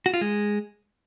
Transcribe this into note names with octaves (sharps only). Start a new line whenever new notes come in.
F#4
F4
G#3